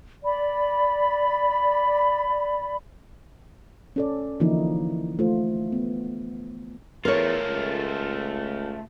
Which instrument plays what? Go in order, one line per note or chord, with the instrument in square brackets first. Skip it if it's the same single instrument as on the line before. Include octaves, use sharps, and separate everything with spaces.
[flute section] D5 B5
[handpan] C#4 A4 D5
D3 E3 F3 A#3 D#4 E4
A3 F4 C5
B3
[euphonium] E2 [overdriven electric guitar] A3 F4 [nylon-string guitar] A#4 C#5
[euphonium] C#2